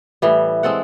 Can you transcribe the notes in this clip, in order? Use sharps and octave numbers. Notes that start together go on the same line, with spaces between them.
A2 E3 G3
G#3 C4 A4 F#5